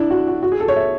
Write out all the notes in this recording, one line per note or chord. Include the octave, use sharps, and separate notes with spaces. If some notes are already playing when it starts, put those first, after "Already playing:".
Already playing: D4 E4
F#4
F#4
F#4
G#4
A4
C#5
E5